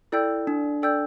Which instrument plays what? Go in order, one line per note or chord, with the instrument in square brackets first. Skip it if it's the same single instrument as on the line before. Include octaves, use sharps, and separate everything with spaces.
[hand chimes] E4 [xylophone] A4 D5 G5 E6 G6
[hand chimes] D4
[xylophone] A4 D5 G5 E6 G6